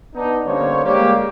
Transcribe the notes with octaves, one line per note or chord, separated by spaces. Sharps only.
B3 D4 D#4
D3 G3 A#3 C#4 C5 C#5
G3 G#3 A#3 G4